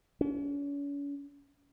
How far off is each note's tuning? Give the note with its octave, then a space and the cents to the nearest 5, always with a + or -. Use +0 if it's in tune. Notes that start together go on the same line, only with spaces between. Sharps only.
C#4 +40